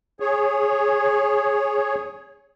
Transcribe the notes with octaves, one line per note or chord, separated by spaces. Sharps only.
G#4 C#5